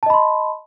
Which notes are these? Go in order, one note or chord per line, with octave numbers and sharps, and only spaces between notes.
D#5 A5 B5 C6